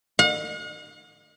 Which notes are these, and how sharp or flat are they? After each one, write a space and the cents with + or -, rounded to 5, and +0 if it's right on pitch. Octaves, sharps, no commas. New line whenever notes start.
F#5 -45